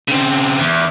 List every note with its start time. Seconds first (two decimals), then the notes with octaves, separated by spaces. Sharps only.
0.08 C#3 C4
0.59 E2